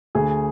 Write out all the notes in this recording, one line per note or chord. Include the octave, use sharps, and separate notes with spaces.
D2 G#4